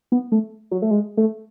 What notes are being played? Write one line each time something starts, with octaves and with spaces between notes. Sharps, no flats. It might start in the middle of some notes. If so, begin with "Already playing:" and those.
B3
A3
F#3
A3
G#3
A3